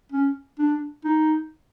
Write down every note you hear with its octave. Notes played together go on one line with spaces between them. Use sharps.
C#4
D4
D#4